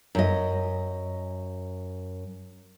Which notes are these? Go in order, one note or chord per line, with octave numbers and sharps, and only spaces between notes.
F#2 D#5